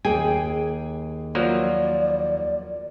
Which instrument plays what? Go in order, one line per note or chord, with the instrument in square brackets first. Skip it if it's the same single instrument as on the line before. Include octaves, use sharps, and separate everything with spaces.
[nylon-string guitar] D#2 G#4 G5 [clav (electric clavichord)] G#5
[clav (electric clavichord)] F3 F#3 A#3 [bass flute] D5